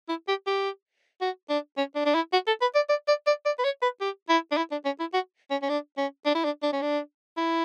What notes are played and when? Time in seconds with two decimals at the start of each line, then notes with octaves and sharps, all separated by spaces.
0.09 E4
0.28 G4
0.47 G4
1.21 F#4
1.49 D4
1.77 C#4
1.96 D4
2.06 D4
2.15 E4
2.33 F#4
2.47 A4
2.61 B4
2.75 D5
2.89 D5
3.08 D5
3.27 D5
3.45 D5
3.59 B4
3.64 C#5
3.82 B4
4.01 G4
4.29 E4
4.52 D4
4.57 E4
4.71 D4
4.85 C#4
5.00 E4
5.14 F#4
5.51 C#4
5.63 C#4
5.69 D4
5.98 C#4
6.26 D4
6.35 E4
6.44 D4
6.63 D4
6.73 C#4
6.82 D4
7.38 E4